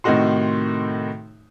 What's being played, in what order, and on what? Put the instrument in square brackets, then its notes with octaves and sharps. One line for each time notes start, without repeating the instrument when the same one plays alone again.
[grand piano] A2 C3 D#3 D#4 F#4 C6